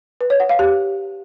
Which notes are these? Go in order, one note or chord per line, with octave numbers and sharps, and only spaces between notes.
B4
C#5
F#5
F5
G4